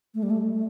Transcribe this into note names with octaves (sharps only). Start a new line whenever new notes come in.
A3
G3
A3
A3